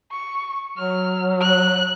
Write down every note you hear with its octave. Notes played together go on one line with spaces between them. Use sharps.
C#6
F#3 F6
F#6